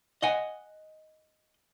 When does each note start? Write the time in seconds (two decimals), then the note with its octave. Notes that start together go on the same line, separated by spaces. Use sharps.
0.22 D#5 F#5 G#5